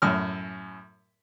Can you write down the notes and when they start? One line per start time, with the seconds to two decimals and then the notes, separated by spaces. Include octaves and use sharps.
0.02 F#2 A2 E6 F6